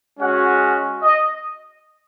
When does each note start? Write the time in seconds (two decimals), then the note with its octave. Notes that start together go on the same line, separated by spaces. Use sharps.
0.19 G#3 C#4 F#4 F#5
1.03 D#5